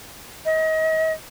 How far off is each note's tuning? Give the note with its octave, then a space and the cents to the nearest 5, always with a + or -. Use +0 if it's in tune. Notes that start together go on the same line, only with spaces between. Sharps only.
D#5 +35